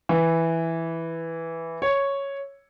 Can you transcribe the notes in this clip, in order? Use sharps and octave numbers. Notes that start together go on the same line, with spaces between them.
E3
C#5